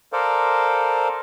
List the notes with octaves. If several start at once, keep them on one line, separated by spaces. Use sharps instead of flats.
A4 A#4 C5 D5 F5